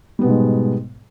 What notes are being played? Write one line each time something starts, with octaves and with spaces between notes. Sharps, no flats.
G#2 B2 G3 G#3 B3